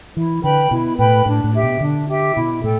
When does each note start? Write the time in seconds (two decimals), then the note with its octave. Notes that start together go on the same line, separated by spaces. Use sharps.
0.16 E3 E4
0.43 D3 B4 G5 B5
0.71 B2 E4
0.98 A2 B4 G5 B5
1.26 A2 D4
1.44 A2
1.53 G4 E5 G5
1.63 B2
1.81 D3 D4
2.08 G4 E5 G5
2.36 B2 E4
2.63 A2 A4 G5